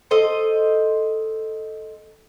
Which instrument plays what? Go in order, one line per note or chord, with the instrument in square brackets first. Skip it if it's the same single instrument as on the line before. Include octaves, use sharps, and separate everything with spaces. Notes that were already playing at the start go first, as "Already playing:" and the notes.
[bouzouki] A4 C5 D#5